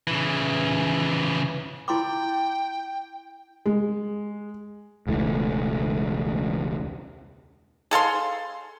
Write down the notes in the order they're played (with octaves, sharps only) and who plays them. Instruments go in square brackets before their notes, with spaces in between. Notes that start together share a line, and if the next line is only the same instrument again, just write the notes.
[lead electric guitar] C#3 E3
[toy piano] E4 C6 D6 [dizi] G5
[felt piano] G#3
[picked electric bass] E1 C#2 E3 A3
[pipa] G#4 A4 F5 C6